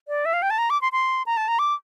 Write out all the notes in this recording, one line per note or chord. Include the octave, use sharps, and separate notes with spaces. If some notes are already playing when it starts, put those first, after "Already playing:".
D5
E5
F5
G5
A5
A#5
D6
C6
C6
A#5
A5
A#5
D6